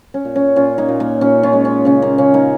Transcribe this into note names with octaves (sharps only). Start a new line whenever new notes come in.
C#4
A#2
C#4
A#2 C#4 F4
A#3 D#4
A#2
A#3
A#2 C#4
C#4 F4
G#3
C#4
C#3 C#4
A#3
C#3 C#4
A#3 D#4